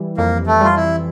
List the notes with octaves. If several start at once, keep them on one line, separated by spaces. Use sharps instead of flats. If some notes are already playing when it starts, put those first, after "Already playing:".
Already playing: E3 G3
F2 A#3
A3
G3 F4
E4